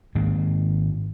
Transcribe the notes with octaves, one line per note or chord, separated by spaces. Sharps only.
G#2 D#3 G#3 A#3